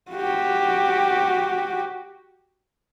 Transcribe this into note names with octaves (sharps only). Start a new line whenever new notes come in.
F#4 G4